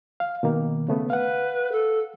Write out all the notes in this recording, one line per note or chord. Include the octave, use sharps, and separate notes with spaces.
F5
B2 D#3 A#3
C#3 A3 B3
B4 F5 F#5
A4